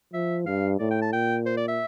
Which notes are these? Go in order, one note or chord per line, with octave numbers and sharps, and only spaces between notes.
F3 E5
G2 F5
A2 D5
G5
A5
A#2 G5
C5
D5
E5